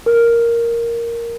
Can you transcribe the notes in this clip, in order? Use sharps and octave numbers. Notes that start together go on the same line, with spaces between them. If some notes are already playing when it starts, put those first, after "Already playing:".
A#4